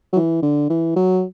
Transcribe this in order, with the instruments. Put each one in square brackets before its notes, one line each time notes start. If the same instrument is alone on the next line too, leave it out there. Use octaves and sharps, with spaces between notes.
[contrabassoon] F#3
E3
D3
E3
F#3